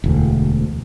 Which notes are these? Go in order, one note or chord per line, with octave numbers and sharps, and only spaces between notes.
E1 D2